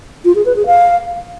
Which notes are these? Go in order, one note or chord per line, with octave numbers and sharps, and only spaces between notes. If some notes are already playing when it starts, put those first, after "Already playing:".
F4
G#4
B4
G#4
F5